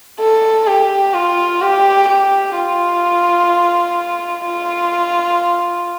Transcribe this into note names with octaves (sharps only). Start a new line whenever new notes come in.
A4
G4
F4
G4
G4
F4
F4